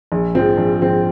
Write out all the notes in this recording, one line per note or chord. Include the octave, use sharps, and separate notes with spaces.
A#1
G#2 F3 C4
A#1
G#2 F3 C4